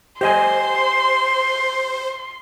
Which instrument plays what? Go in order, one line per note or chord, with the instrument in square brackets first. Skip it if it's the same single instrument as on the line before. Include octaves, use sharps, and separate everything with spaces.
[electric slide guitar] G4 D#5 G#5 [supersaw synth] C5 [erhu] C6